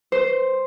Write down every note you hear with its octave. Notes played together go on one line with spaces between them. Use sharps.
C5